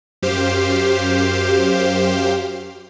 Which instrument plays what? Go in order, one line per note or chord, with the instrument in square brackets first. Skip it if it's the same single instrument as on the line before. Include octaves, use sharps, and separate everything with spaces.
[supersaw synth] F#2 G4 C5 F5